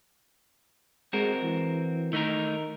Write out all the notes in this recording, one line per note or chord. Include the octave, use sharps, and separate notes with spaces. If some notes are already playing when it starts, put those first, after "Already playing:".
G#3 C4 F#4 A#4
E3
D#3 A3 D#4 A#4